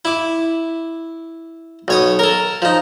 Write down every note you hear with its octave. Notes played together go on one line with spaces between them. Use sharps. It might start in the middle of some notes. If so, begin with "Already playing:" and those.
E4 D6
B1 C#5 D#6
A4 A#4
F3 D#4